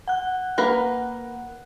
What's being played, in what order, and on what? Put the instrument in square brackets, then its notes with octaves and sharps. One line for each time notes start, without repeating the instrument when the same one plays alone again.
[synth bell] F#5 F#6
[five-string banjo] A#3 A#4 B4